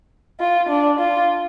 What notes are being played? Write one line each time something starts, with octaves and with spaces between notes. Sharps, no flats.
F4
D4
F4